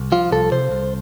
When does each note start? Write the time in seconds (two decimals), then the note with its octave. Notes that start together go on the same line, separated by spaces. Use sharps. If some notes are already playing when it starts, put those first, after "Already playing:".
Already playing: C2
0.12 F3 F4
0.32 C2 A4
0.52 C3 C5
0.71 C2